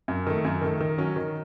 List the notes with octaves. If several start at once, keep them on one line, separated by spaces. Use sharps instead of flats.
F#2
D#3 A3
F#2
D#3 A3
D#3
F#3 C#4
D#3